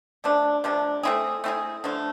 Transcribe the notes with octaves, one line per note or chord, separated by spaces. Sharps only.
C3 F3 A3 D4
C3 F3 A3 D4
A3 C4 E4 G#4
A3 C4 E4 G#4
D3 F3 A3